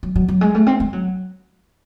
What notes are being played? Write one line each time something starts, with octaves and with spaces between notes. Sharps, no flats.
F#3
F#3
F#3
G#3
A3
C4
G#3
F#3